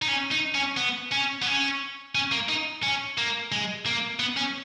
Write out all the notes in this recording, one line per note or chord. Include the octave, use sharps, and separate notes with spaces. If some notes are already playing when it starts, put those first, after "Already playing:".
D#4
C#4
D#4
C#4
B3
C#4
B3
C#4
C#4
A#3
D#4
C#4
A#3
G#3
A#3
B3
C#4